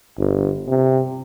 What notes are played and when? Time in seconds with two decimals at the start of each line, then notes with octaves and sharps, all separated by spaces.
0.18 G1
0.68 C3